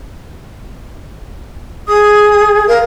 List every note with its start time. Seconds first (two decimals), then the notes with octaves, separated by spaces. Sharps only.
1.88 G#4 D#6
2.68 A#4 F5